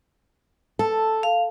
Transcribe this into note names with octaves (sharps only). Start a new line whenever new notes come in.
A4
F5